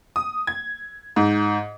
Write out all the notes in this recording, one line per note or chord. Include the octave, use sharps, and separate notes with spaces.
D#6
G#6
G#2